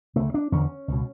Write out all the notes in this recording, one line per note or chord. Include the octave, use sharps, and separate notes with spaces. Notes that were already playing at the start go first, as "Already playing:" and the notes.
D2 C#3 A3
D4
E2 D3 C#4
C#2 B2